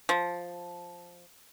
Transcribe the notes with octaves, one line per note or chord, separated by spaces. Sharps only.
F3